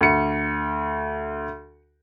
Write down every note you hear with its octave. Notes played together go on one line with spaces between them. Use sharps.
D2 C#7